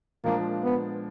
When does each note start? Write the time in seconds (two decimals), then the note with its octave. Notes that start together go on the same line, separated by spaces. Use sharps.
0.24 A#2 F3 G#3 A#3 D4
0.63 B3